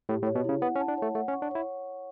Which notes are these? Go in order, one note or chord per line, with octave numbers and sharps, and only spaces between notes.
A2 G4
A2
C#5
B2
C#3 E4
B3 F#5
C#4
A5
D4
A3 C#5
A3 F#5
C#4
C#6
D4
E4 C#5